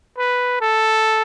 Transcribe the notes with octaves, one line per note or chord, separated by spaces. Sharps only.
B4
A4